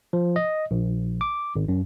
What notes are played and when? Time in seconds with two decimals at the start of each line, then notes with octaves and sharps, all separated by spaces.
0.13 F3
0.36 D#5
0.71 A#1
1.21 D6
1.56 G#1
1.68 F#2